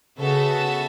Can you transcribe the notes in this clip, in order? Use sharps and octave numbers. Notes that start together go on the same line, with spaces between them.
C#3 B3 F#4 A4 E5